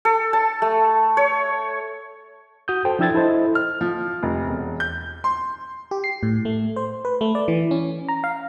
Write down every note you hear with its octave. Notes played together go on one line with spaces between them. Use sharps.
A4
A5
A3
C#5
F#4 D#6 G6
A4 C5 G5
F3 D4 E4 E6 G#6 A6
E4 A4 C5 D#5
F6
F3
F1
E1
G6
C6
G4
C7
A2
A3
C5
B4
A3
D5
E3
C#4
A#5
F5